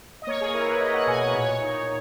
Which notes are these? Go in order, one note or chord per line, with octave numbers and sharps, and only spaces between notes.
D#5
A#3 C#5
G#4
E4 A#4
B4
E4 D#5
F#5
B2 G#5
F#5
A#2 C#5
D#4